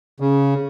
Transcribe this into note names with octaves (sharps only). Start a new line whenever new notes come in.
C#3